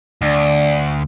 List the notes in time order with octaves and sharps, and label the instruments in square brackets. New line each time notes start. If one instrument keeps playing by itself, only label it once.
[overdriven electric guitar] D2 [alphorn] D4